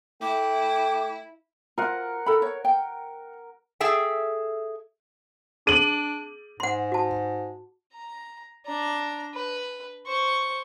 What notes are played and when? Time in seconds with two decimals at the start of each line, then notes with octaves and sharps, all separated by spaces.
0.21 A3 E4 G5 D6
1.78 F4 A#4 F#5
2.26 E4 A4 B5
2.42 C#5
2.65 G5
3.80 G#4 A4 E5 G5
5.67 D4 G#4 D#7 F#7
6.60 G#2 F#5 C6
6.92 F#4 A5
7.94 A#5
8.66 D4 A#5
9.34 B4
10.06 C5 C#6